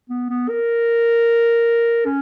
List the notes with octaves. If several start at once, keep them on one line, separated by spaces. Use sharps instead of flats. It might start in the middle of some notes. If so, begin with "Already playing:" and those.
B3
B3
A#4
C#4